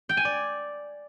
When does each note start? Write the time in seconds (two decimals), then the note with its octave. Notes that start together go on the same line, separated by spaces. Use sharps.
0.09 G5
0.17 G#5
0.25 D5